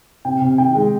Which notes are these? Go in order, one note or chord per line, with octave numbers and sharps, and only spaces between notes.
C3 G5
C3
D#3 G5
G#3